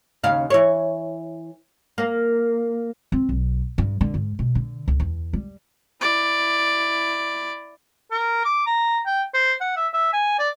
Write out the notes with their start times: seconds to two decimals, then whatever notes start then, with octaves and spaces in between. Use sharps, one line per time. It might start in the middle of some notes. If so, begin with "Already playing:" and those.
0.23 D#2 C#3 F5
0.50 E3 C#5
1.98 A#3
3.12 C4
3.29 B1
3.78 G2
4.01 D3
4.14 G#2
4.39 B2
4.55 D3
4.88 C#2
5.00 E2
5.33 G3
6.01 E4 D5
8.11 A#4
8.45 D6
8.66 A#5
9.06 G5
9.34 C5
9.61 F#5
9.77 E5
9.94 E5
10.13 G#5
10.39 D5